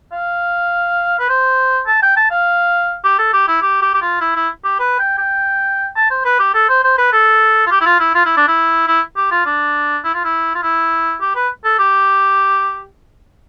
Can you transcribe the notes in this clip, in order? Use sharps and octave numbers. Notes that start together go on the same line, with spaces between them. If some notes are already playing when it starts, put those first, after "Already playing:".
F5
B4
C5
A5
G5
A5
F5
G4
A4
G4
E4
G4
G4
G4
F4
E4
E4
G4
B4
G5
G5
A5
C5
B4
G4
A4
C5
C5
B4
A4
F4
G4
E4
F4
E4
F4
E4
D4
E4
E4
G4
F4
D4
E4
F4
E4
F4
E4
G4
B4
A4
G4